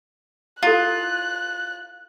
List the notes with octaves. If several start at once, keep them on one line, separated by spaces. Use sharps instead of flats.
E4 F4 A4 F#6